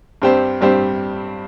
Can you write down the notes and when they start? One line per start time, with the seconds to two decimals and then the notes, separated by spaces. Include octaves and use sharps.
0.22 G2 G3 C4 G4 C5
0.61 G2 G3 C4 G4 C5